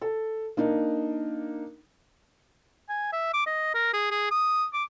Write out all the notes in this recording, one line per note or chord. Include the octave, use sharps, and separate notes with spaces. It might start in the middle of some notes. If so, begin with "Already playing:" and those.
A4
A#3 D4 D#4
G#5
E5
D6
D#5
A#4
G#4
G#4
D#6
D6